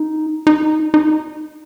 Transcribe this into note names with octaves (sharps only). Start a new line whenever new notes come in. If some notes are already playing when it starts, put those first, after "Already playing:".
Already playing: D#4
D#4
D#4